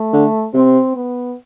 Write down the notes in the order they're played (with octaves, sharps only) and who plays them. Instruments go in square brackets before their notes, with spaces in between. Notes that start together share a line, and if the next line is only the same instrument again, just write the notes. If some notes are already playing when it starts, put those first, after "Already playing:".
Already playing: [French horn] A3
[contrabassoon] D3
[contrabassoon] C3 [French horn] C4
[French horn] B3